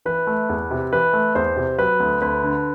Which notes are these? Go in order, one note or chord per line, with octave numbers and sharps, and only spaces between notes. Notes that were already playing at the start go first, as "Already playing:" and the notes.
E3 B4
A3
E2
C3
E3 B4
A3
E2 C5
C3
F#3 B4
D2
D2 B4
D3